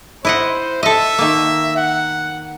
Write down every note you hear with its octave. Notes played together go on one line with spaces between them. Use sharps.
E4 C5 D#5 F#5
A4 D#5 E5
D#3 A#3
F#5